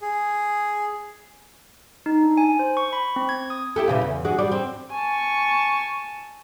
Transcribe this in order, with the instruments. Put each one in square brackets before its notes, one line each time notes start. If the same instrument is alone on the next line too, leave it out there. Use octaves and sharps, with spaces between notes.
[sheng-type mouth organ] G#4
[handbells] D#4
D4
G#5
C5
C#6
B5
C4
G#6
D#6
[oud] E4 G4 A4
A#2 C#3 E3
E2
D4 F#4 G#4
G3 D5
C4
[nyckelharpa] G#5 A5 [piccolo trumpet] C#6